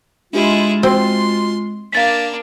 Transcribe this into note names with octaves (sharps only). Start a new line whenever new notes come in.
G#3 D4 E4 F4 G4 G#4
C4 F#4 C6
A#3 D4 F5 A6 B6